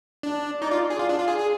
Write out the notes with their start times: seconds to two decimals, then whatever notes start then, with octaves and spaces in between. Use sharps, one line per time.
0.23 D4
0.61 D#4 D5
0.71 F4
0.90 G#4
0.99 F4
1.09 D4
1.18 F4
1.28 G#4
1.38 G#4